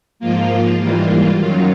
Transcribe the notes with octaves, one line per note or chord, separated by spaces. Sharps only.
G#2 F3 A#3 F4
G#2 E3 G3 A#3 F4
F#2 D#3 F#3 F4